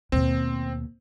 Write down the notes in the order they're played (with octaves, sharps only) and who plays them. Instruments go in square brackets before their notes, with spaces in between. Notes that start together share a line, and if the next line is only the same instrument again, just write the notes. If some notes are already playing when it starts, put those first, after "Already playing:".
[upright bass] D#2 B2 [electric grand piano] C4